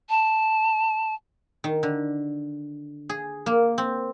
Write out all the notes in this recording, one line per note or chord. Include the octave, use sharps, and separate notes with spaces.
A5
D#3
D3
G#4
A#3
C4